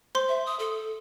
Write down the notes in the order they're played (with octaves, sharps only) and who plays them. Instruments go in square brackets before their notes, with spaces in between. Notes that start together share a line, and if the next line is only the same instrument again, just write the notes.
[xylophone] C5 C6
[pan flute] E5
D#6
A4